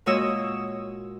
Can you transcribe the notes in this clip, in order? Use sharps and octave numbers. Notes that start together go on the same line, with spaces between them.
A#2 G#3 F#4 C#5 D#5 E6